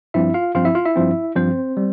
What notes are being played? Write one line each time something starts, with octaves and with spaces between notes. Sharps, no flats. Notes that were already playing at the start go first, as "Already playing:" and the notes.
G2 F3 C4 E4 E5
F4 F5
G2 F3 C4 F4 F5
E4 E5
F4 F5
E4 E5
G2 F3 C4
G2 F3 C4 C5
G3